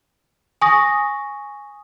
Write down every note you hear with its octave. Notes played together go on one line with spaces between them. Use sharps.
G#5 C#6 D#6 A#6